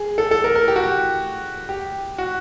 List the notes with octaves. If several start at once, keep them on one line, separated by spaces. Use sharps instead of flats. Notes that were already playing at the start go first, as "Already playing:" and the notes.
Already playing: G#4
A4
A4
A#4
A#4
G4
F#4
G4
G4
F#4